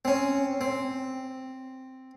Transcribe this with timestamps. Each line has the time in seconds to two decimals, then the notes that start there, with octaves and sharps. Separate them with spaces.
0.05 C4 C#4
0.61 C4